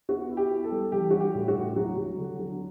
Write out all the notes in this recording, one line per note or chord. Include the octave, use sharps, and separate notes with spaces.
B3 F#4
E4
G4
B3
A4
G3
E3 G4
G3 F#4
G4
A2
F#4
A2
F#3 F#4
F#3
D3
F#3